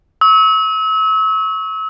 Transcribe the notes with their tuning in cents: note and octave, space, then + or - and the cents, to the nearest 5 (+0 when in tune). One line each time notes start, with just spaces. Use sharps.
C#6 +0 E6 -35